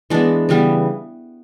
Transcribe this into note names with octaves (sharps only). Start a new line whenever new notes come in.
E3 G#3 B3 D4
C#3 E3 G3 B3